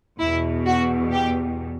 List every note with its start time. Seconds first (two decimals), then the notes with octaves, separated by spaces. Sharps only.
0.19 E2 B2 E4
0.66 F#4
1.12 G4